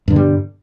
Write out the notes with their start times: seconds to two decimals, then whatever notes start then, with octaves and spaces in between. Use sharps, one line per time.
0.08 G2
0.10 D3
0.13 B2
0.16 G3